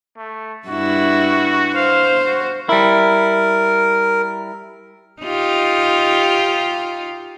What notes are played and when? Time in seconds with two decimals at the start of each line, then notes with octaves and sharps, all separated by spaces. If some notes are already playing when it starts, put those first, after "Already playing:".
0.17 A3
0.68 G2 E4 F#4
1.75 C5 F5
2.25 F#4
2.69 G3 E4 A#4
5.22 D#4 F4 G4